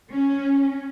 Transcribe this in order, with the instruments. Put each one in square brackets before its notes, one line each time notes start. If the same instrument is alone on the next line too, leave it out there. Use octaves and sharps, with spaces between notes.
[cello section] C#4